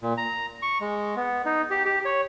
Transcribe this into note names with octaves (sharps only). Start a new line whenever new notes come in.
A#2
A#5
C#6
G#3
B3
D#4
G4
G4
C#5